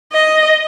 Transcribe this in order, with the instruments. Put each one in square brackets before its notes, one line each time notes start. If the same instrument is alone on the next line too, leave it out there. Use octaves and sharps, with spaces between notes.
[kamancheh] D#5